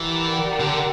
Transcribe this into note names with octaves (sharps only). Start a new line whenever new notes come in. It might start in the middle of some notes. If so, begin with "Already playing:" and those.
Already playing: E3 G4 A#4 D5 F#5
D3